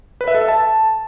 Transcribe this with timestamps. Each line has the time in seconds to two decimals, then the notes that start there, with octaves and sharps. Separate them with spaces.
0.21 B4
0.28 E5
0.35 A4
0.41 E5
0.48 A5